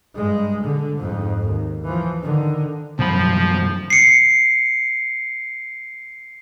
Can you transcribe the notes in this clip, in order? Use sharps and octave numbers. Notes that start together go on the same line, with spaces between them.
G2 G#3
D3
F2 G#2
D#2
E3 F3
D3 D#3
C2 F#2 B2 F3 F#3 B5
C7 C#7